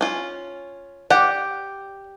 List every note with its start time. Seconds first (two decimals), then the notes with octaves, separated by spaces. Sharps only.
0.01 C#4 F4
1.10 G4 D5 F#5